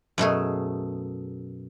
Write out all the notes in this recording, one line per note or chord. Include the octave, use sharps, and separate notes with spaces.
F#2 B2 A3 G#4